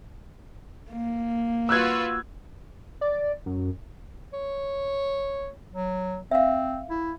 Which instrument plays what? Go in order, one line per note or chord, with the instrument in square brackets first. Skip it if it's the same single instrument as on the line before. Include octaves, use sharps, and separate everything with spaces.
[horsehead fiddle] A#3
[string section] F4 F#4 B4 [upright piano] E6 F#6 G#6
[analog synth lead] D5
F#2
[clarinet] C#5
F#3
[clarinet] C4 [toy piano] E5 F5
[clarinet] E4